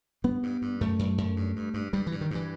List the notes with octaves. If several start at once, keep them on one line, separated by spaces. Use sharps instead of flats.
G2 B3
G2
G2
F#2 A3
F#2
F#2
G2
G2
G2
G2 G3
G2 E3
D#3
G2 E3